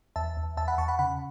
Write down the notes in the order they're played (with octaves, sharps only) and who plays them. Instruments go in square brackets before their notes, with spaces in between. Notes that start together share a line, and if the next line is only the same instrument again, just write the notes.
[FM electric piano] E2 E5 A5
E2
E2 E5 A5
F#5 B5
E2 A5 C#6
F#5 B5
C#3 F#5 B5